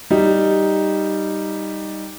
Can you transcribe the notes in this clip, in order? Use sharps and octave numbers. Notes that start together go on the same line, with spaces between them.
G3 D#4